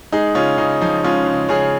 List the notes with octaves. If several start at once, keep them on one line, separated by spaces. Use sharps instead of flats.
G#3 D#4 G#4
C#3 C#4 F4
C#3 D#4
F3 D#4
G#3 C#4 F4
C#3
C#3 G#4 C#5